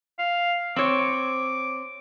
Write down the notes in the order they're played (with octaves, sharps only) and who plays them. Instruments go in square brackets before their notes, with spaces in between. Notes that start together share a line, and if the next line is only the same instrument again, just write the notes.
[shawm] F5
[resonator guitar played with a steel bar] C4 C#5 [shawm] D6